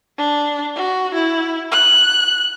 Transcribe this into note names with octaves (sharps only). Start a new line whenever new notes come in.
D4
F#4
E4
F#6